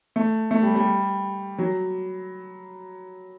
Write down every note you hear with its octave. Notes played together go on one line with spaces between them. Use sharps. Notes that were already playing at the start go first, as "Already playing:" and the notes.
A3
A3
G3
G3
F#3